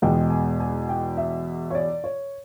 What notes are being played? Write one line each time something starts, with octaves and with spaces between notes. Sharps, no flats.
E2 B2 G#3 G5
G#5
G#5
G5
E5
C#5
D5
C#5